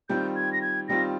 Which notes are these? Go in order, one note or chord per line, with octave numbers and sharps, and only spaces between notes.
D#3 G3 C4 F4 G6
G#6
A#6
G#6
D#3 G3 C4 F4 A#6